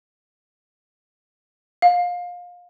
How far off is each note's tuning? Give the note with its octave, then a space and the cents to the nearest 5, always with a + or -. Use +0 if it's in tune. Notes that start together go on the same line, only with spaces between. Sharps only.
F5 +25